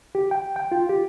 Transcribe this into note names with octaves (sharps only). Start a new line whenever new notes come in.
G4
G5
G5
F4
G4